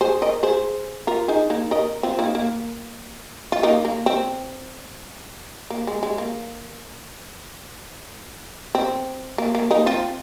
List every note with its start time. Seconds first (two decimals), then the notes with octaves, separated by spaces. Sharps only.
0.01 G#4 C5
0.22 A#4 D#5
0.43 G#4 C5
1.07 F4 A#4
1.28 D#4 G#4
1.50 A#3 D#4
1.71 A#4 D#5
2.03 C4 F4
2.19 A#3 D#4
2.35 A#3
3.52 F4
3.63 A#3 D#4
3.85 A#3
4.06 C4
5.70 A#3
5.87 G#3
6.03 G#3
6.18 A#3
8.75 C4
9.38 A#3
9.55 A#3
9.71 A#3 D#4
9.86 C4 F4